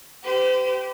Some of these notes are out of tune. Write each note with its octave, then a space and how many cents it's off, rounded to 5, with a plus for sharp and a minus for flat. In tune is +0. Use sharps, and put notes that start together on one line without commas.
G4 -10 C5 -45